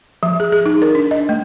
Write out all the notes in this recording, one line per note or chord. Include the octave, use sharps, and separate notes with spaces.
F3
G#4
G#4
D#4
A#4
D4
D#5
A3